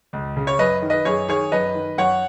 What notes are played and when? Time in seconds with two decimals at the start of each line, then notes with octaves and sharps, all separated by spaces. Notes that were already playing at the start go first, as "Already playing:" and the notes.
0.13 C#2
0.37 C#3
0.47 C#5
0.59 F#2 B4 D#5
0.82 D#3
0.90 B4 D#5
1.05 F#2 G#4 C#5
1.28 D#3 G#4 C#5
1.52 F#2 B4 D#5
1.75 D#3
1.98 F#2 C#5 F#5